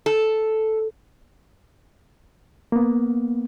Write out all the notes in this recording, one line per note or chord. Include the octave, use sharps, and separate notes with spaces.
A4
A#3 B3